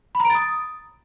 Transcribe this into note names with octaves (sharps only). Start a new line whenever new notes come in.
B5
A#5
D7
A6
D#6